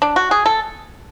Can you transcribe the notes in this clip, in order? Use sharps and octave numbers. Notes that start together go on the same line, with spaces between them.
D4
F#4
G#4
A4